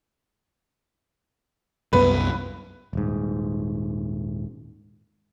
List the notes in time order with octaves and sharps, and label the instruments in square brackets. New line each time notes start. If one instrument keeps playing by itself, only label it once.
[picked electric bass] C2 F#2 B3 [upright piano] B4
[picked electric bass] D#1 G#2